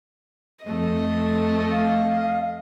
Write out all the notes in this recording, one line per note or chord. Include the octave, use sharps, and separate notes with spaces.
F2 A3 D#5
F5